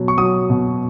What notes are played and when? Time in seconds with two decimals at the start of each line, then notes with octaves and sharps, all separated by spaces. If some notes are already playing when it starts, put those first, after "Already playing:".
Already playing: B2 F#3
0.08 C#6
0.18 F#3 D#6
0.50 B2